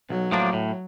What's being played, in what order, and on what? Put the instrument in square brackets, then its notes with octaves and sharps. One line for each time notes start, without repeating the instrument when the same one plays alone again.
[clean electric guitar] B1 [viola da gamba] F#3
[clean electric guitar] A2 F3 A#3 D4
A2